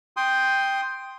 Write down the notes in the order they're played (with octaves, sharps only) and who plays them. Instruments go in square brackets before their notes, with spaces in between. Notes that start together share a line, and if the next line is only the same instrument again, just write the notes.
[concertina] G5 C6 D#6